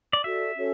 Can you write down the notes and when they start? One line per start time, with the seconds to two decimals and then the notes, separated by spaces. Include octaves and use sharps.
0.13 D5
0.24 F#4 A4 D5 E5
0.57 C#4 F#4 A4 C#5